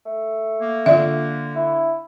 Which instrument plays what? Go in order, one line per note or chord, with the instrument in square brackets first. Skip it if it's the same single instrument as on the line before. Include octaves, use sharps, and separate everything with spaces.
[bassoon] A3
[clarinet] A#3
[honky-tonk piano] D3 [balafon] F4 D5 E5
[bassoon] E4